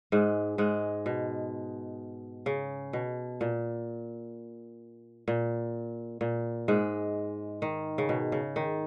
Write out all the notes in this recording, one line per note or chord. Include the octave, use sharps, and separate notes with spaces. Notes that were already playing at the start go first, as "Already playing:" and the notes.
G#2 G#3
G#2 G#3
B2
C#3
B2
A#2
A#2
A#2
G#2 G#3
D#3
C#3
B2
C#3
D#3